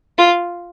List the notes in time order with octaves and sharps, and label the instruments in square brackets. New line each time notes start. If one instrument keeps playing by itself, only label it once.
[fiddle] F4